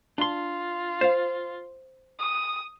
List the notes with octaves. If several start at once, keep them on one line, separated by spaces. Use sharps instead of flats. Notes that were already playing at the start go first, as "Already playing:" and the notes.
D4 F4 C6
C5 F5
D#6